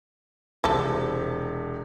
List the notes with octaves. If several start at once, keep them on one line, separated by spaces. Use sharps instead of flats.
E1 C3 F3 A3 A4